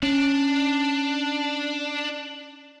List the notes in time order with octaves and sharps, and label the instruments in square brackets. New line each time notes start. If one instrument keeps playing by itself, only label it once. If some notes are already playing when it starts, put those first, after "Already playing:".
[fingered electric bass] C#4 [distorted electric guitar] D4